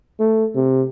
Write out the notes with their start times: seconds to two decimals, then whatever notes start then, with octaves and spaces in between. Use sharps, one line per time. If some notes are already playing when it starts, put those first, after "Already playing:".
0.19 A3
0.55 C3